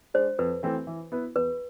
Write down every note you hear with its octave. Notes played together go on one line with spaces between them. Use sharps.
G#3 D4 C5
F2 B4
E3 A3 C4
E3
B3 E4 B4
E2 B4